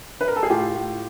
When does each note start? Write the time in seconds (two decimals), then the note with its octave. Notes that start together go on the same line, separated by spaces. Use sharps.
0.21 B4
0.28 A#4
0.36 A4
0.43 G#4
0.50 A2 F4 G4
0.74 A2